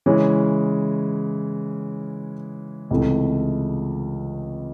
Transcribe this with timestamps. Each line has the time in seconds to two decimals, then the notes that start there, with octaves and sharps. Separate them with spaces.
0.06 C#3 E3 G#3 C#4
2.90 C#2 C3 E3 A3